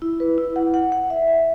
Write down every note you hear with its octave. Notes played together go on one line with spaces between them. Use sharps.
E4
B4
E4
F#5
F#5
F#5
E5
E5